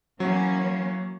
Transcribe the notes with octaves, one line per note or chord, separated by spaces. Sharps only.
E3 F#3 A#3 C#4